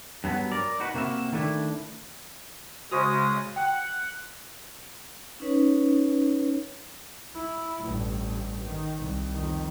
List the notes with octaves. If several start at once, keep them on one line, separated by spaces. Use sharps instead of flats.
G2 F#3 B3
A#4 D5
D#4 F#4 B4
C3 A#3 F#4 E5
D#3 A3 D4 E4
C#3 G#3 F#4 C5 C#6 D#6
F#5 G5
C#4 D#4 B4 C#5
E4
A1 G2
D#3
C2
F2 D#3